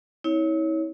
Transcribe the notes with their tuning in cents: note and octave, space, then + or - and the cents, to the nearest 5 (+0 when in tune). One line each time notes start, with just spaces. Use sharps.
C4 +0 E4 -40 C#5 +0